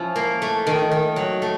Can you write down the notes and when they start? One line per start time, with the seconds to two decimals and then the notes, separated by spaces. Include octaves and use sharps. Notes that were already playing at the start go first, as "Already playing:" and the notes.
Already playing: F3 C#4 E4
0.16 A#3
0.42 A3
0.67 D#3
0.91 D#3
1.16 F#3
1.42 A3